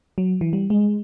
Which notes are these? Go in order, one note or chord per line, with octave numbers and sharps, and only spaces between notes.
F#3
E3
G3
G#3